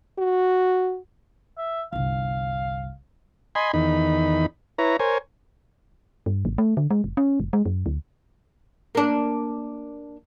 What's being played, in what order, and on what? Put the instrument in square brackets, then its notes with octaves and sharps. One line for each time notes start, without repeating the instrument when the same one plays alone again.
[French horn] F#4
[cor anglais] E5
[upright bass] G1 C2 [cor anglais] F5
[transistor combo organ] D#5 G#5 B5 C6
E2 D#3 D#4 B5
E4 B4 C#5 A#5
A#4 C5 C#5 G#5
[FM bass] G2
G#1
A3
D3
G#3
F#1
C#4
F#1
G#3
F#2
D2
[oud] A#3 D4